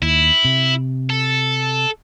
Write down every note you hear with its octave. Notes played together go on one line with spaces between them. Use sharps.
D#2 E4
C3
A4